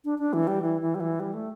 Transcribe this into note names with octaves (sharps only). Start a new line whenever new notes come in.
D4
D4
E3
G3
E3
E3
G3
E3
G3
A3